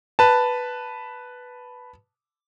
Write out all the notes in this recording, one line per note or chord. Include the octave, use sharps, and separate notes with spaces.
B4 A5